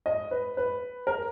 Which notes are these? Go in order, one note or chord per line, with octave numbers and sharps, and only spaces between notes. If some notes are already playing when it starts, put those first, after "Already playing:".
D#5
B4
B4
A#4